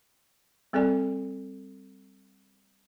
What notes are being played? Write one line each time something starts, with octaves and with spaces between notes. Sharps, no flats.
G3 C4 G#4 A4 D5 G#5